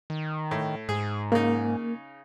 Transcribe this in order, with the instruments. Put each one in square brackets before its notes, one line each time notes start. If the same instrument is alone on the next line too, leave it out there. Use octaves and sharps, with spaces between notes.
[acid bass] D#3
[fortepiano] A2
[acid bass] G#2 [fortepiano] G#4
[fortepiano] C#3 D#4 [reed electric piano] A#3